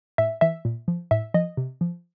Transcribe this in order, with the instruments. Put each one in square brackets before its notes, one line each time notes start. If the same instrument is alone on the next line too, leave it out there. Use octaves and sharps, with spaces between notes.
[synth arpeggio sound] A2 E5
E3 E5
A#2
F3
A2 E5
F3 D#5
C3
F3